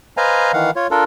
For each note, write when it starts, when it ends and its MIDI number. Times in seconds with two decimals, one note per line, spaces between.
0.17 0.52 71
0.17 0.52 72
0.17 0.52 75
0.17 0.52 77
0.17 0.52 80
0.17 0.52 82
0.53 0.71 51
0.53 0.71 52
0.53 0.71 77
0.53 0.71 78
0.76 0.87 65
0.76 0.87 73
0.91 1.04 62
0.91 1.04 65
0.91 1.04 69
0.91 1.04 70